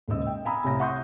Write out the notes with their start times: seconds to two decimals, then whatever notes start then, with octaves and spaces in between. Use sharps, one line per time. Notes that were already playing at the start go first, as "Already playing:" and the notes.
0.08 D#1 G#2 C#3 D#5 E6
0.27 G5
0.45 F5 G#5 A#5 B5 D#6 E6
0.64 C2 A2 C3 C#5 A#5 A#6
0.79 F5 F#5 C6 C#6 D#6 G6